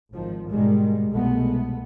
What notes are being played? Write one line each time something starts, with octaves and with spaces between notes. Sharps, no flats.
G#1 D#3 F3
G#2 B2 D#3 G3 G#3
C2 B2 G#3 A3 B3